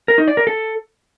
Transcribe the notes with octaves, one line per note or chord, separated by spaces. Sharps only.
A#4
D#4
D5
A#4
A4